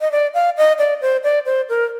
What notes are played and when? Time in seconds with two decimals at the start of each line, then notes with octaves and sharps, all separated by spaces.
0.01 D#5
0.12 D5
0.34 F5
0.57 D#5
0.78 D5
1.01 C5
1.24 D5
1.46 C5
1.69 A#4